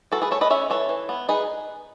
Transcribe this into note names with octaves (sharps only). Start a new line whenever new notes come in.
E3 F#4 A4
G#4 B4
A3 A4 C#5
B4 D#5
C#4 C#5 E5
E3 A4 C#5
E3
B3
D#4 G#4 B4